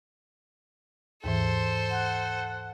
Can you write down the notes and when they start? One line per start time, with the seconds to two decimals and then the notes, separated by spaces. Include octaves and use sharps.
1.24 D#2 G#2 E3 A4 C5
1.90 F#5